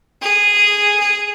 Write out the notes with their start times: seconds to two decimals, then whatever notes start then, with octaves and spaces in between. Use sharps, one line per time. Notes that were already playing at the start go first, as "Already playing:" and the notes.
0.22 G#4
1.00 G#4